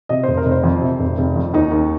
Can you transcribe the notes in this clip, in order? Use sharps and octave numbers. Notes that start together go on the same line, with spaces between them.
C3 D#5
F1 C5
A#4
F1
C5
F2
C3
F1
F1
F2
D#2 D#4
D#2